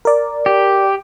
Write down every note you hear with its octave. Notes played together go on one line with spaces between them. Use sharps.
A#4 D5
G4